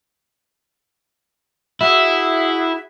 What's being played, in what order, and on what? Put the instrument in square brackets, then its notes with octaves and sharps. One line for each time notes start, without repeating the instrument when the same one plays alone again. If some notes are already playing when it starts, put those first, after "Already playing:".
[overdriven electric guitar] E4 [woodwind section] F#4 G#4 E5